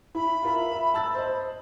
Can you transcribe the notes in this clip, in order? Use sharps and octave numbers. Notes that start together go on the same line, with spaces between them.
E4 B5
F4 A#4 E5
E5
A5 E6 A6
C5 D#5